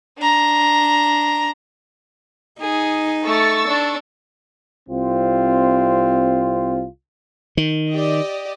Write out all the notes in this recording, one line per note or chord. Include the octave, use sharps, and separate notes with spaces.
D4 A#5
D#4 G#4
A3 C#6 E6 A6
D4
C2 C4 F4
D#3
G4 D5 D#5